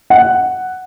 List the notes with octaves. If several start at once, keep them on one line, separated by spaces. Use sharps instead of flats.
F#5